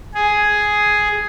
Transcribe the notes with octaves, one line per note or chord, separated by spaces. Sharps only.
G#4